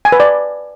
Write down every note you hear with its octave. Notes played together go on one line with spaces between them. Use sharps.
G#5
B4
D5